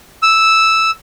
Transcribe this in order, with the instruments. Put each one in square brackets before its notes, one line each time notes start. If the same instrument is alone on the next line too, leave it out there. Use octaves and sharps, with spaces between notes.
[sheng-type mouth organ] E6